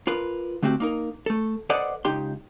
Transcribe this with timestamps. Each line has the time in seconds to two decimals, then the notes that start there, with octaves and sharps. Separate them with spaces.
0.07 F4 A#4 B4
0.62 D3 A3 C4 F#4 G4
0.80 A#3 D#4 A#4
1.26 A3 A4
1.70 A4 B4 C5 D5 D#5 F#5
2.05 C#2 D#4 G4 C6